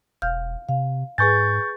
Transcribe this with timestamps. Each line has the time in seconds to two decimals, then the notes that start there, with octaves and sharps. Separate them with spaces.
0.22 E1 F5 F6 G6
0.69 C3 F5
1.18 G#2 G#4 B4 G#5 C#6 G6 A6